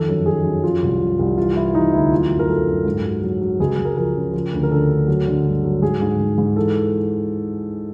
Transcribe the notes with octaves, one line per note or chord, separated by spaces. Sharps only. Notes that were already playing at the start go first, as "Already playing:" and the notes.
Already playing: F2 D#3 A4
F#2
D#3 G#4
F#2
F3 F4
C2
F3
C2
E3 F4
E3 E4
E3 D#4
D2 E4
F#3 F4
F#2
A#4
F#3 A4
F#2
G#2
F#3
F#3
F#3
C#2 G#4
C#2
A#4
F3 A#4
C#3
F3
D2
A#4
D3 A4
D2
F#3
D3
G2
F#3
G#2 G#4
G#2
G#2
G#2
E3 A4